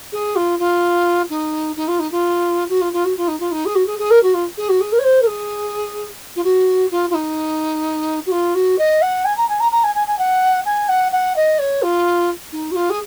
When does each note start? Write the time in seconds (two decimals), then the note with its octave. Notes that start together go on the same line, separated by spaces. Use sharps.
0.13 G#4
0.36 F4
0.59 F4
1.30 D#4
1.77 D#4
1.88 F4
2.00 D#4
2.12 F4
2.69 F#4
2.81 F4
2.93 F4
3.05 F#4
3.17 F4
3.28 D#4
3.40 F4
3.52 D#4
3.66 G#4
3.75 F#4
3.87 G#4
3.99 G#4
4.11 A#4
4.23 F#4
4.34 F4
4.58 G#4
4.69 F#4
4.81 G#4
4.92 A#4
4.99 C#5
5.04 C5
5.22 A#4
5.27 G#4
6.36 F4
6.44 F#4
6.91 F4
7.10 F4
7.14 D#4
8.26 F#4
8.32 F4
8.55 F#4
8.79 D#5
9.02 F#5
9.25 G#5
9.37 A#5
9.49 G#5
9.60 A#5
9.72 A#5
9.84 G#5
9.95 G#5
10.07 G#5
10.19 F#5
10.66 G#5
10.89 F#5
11.12 F#5
11.36 D#5
11.59 C#5
11.82 F4
12.52 D#4
12.71 F#4
12.76 F4
12.90 G#4